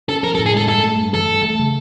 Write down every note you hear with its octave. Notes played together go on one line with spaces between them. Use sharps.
C#4 A4
F3 A#4
A4
A2
G#4
G#3 A4
G2 A4
A3
G2
E3 A4
G2
A3
C#3